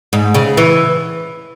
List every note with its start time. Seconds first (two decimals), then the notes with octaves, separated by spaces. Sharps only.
0.13 G#2
0.35 C#3
0.57 E3